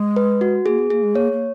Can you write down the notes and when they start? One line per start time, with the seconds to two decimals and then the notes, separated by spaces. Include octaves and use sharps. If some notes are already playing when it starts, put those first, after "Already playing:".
Already playing: G#3
0.16 B4
0.41 F#4
0.66 A#3 G#4
0.78 B3
0.90 A#3 G#4
1.03 G#3
1.15 A#3 C#5
1.32 A#3